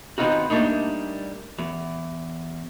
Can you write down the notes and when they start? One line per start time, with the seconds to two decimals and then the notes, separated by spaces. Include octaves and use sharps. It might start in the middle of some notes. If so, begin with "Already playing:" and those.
0.18 D#3 B3 C4 D#4 F4 F#4
0.50 G3 A3 A#3 D4 D#4
1.58 E2